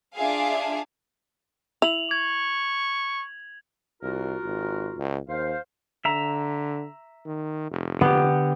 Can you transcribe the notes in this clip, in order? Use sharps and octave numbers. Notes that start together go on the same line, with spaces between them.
D4 F4 G#4 E5 F5 G#5
E4 F7 F#7
C#6 G#6
C2 F4 F#4 A#4
G#1
C#2
D#2 C5 F5
D3 E5 A#5
D#3
F1
D3 B3 G4